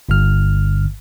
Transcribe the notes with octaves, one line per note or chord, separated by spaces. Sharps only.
G1 G2 D3 F6